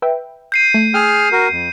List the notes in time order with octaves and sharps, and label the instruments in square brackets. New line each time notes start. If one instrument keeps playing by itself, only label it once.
[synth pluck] B4 E5 G5
[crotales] G6 C7 D#7
[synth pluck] A3
[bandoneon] G#4 F6 [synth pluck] G5 E6
[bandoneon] F#4 A#4
F2